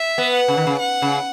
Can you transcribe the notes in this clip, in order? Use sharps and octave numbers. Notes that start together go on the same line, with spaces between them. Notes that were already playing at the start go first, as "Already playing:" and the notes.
Already playing: E5
B3
F#5
C#3
D#3
C#3
F#5
C#3